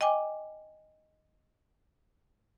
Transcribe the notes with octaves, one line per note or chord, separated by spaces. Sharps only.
D#5 G5 G#5 D6